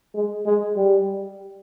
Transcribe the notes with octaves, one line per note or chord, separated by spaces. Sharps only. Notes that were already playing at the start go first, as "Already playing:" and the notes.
G#3
G#3
G3